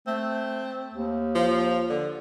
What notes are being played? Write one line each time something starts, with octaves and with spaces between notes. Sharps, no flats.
A3 C4
D#2
F3
D3